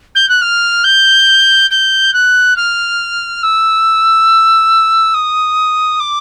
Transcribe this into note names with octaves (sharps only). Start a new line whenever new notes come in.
G6
F#6
F6
G6
G6
F#6
F6
E6
D#6
D6